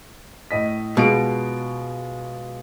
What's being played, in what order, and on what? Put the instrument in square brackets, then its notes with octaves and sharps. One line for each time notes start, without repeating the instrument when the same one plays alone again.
[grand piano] A2 D#5 B6
[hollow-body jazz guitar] B2 [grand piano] G#3 F4 D7